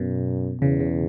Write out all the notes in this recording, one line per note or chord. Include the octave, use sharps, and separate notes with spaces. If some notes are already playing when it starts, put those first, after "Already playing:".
Already playing: F#2 B2
E2 C#3
C#3